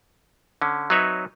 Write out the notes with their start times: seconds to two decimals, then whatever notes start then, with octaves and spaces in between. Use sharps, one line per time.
0.62 D3 C#4
0.90 F#3 C4 D#4 B4 C#5 E5